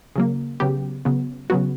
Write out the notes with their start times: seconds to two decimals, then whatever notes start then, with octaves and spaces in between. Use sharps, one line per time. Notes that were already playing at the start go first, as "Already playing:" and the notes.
0.16 C#3 F#3 A#3
0.60 C#3 F#3 B3 G4
1.05 C#3 F#3 B3
1.50 C#3 F#3 B3 F#4